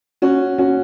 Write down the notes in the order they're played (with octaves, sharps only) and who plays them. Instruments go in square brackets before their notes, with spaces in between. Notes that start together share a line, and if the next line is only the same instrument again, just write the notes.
[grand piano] C#4 F#4
C#4 F#4